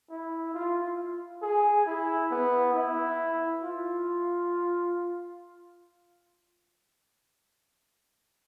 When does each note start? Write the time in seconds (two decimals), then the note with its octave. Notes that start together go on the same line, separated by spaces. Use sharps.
0.10 E4
0.54 F4
1.42 G#4
1.86 E4
2.31 B3
2.73 E4
3.62 F4